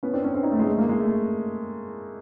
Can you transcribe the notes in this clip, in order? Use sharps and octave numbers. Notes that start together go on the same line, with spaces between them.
B3 C#4
C4 D4
B3 C#4
C4 D4
C#4 D#4
A3
G#3
A3
G#3 A#3
G#3
A3